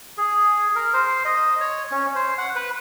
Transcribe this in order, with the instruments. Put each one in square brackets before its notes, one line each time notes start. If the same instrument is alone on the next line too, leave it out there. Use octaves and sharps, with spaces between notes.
[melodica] G#4
A#4
C5
D#5
C#5
C#4
C5
F#5
B4